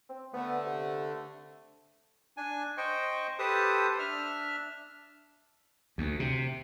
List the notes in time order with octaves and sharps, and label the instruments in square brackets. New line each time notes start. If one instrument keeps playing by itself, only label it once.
[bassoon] C4
[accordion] D3 A3 [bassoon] B3
[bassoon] C3
[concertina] D4 G#5
C5 D#5 G5 C#6
G4 A4 B4 C5 A5 D#6
D4 E5 F6
[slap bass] D2
C3